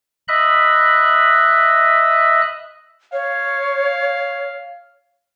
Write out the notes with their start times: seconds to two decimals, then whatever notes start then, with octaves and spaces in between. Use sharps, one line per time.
0.28 D#5 E5 B5 F#6
3.13 C#5 F5